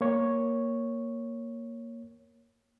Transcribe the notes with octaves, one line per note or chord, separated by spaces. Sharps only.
A#3 C#5